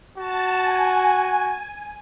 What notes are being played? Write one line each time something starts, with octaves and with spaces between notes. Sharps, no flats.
F#4 A5
G#5
G#5